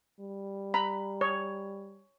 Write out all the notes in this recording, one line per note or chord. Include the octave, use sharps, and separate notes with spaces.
G3
A#5 B5
C#5